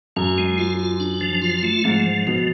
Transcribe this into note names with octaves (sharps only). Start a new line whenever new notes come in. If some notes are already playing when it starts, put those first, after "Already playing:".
F#2 C#4
G#3
F4
F4
D4
F3
F4
A3
G#2 F3
F3
B2 F3